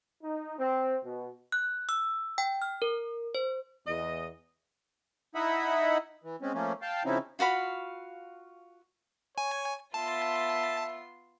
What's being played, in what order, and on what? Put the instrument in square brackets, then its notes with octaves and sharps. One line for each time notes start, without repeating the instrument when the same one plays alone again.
[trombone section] D#4
C4
B2
[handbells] F#6
E6
G5
F6
A#4
C5
[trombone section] E2 [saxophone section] D#5
[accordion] D#4 E4 D#5 E5 F#5 B5
E3
G#3 C4 C#4
F3 A3 A#3 C#4
F5 G5 A5
C#3 F3 C4 C#4 D#4 E4
[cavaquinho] F4 F#4 F5 B5
[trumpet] C#5 [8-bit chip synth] G#5
[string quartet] B3 F4 C6 [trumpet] E5 [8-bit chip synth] A5